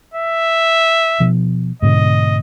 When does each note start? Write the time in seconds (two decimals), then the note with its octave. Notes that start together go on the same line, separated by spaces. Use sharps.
0.14 E5
1.20 B2 F3
1.82 G#2 B2 D3 D#5